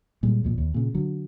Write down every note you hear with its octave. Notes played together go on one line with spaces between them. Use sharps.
A#2 G3 G#3
G#1 F2 A#2
D#2
A#2 C#3
D3 F#3